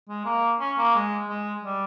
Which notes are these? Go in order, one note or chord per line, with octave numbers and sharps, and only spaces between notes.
G#3
A#3
C#4
A#3
G#3
G#3
G3